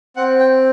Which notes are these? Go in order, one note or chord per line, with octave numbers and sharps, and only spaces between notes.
C4 F#5
G5